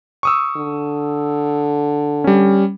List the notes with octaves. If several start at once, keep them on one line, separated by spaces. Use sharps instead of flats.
C#6 D#6 E6
D3
G3 C#4